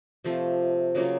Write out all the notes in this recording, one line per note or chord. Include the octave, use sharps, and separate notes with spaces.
C3 F3 A3
C#3 F#3 A#3 F4